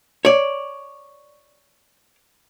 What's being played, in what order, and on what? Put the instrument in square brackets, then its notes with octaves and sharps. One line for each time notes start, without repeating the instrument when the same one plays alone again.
[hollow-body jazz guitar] C#5 D5